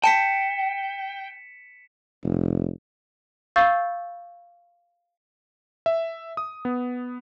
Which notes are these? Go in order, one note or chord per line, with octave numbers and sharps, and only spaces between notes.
G5 A5 B6 C#7 E7
F1
F5 C#6 E6 G6 A6
E5
D#6
B3